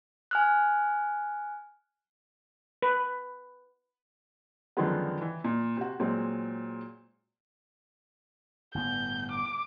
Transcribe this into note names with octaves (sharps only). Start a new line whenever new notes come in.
G#5 F6 F#6
B4
F#2 D3 D#3 F3 G#3 B3
E3
A#2
C3 F#4
A#2 F#3 G#3 C4
G1 A2 B3 G6
D6